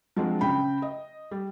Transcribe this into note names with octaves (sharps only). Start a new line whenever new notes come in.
F3 F#3 G#3 C4 D4
C#3 G5 B5
D#5
G3